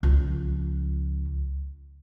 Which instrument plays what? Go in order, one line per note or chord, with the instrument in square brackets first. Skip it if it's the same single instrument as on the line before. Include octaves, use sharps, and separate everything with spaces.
[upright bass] C#2 F3